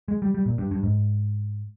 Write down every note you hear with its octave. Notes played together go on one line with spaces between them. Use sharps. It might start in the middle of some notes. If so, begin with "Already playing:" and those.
G#3
G3
G3
A#2
G2
G2
G#2